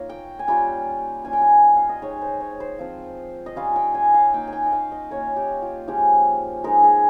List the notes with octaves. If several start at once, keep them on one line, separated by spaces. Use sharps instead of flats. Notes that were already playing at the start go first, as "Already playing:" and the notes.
Already playing: A#3 D#4 F4 C#5 A#5
G5
G#5
G3 C#4 F4 G5
G3 C#4 F4 G#5
G5
G#5
F5
D#5
G#3 D#4 C#5
C5
C#5
C5
F3 C4 F4
D#5
G3 C#4 F4 F5
G5
G#5
F5
A#3 D#4 G5
G#5
G5
D#5
F5
D#5
A#3 C#4 F4 C#5
G4
F4
F3 G#3 C#4 F4 G4
G#3 D#4 A#4
G#4